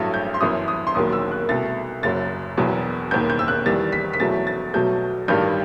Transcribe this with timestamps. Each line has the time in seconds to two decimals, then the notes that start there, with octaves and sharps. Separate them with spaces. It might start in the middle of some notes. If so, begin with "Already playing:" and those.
Already playing: A1 G2 F#3 A3
0.14 G6
0.34 C6
0.41 G1 F#2 E3 D#6
0.68 D#6
0.87 C6
0.95 E1 D#2 D#3 F#3 D#6
1.13 E6
1.31 F#6
1.49 C2 B2 A3 A6
2.03 F#1 F#2 F#3 A6
2.57 E1 E2 B2 F#3
3.11 E1 D#2 D#3 G6
3.30 G6
3.39 E6
3.48 F#6
3.66 E2 D#3 G3 A6
3.92 B6
4.13 B6
4.20 E2 B2 F#3 A3 A6
4.47 A6
4.74 B1 B2 F#3 A3 G6
5.28 A1 G2 D#3 G3 G6